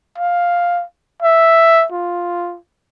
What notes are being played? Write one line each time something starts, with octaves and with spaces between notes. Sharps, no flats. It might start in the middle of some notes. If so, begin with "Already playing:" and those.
F5
E5
F4